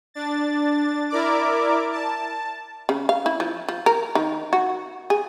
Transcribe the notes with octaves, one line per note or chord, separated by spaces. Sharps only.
D4 A6
E4 A#4 D5 D6
A5
C#3
F5
E4
F3
F3
A#4
D#3
F#4
G#4